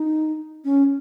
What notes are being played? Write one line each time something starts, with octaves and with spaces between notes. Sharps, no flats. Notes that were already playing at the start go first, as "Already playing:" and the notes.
Already playing: D#4
C#4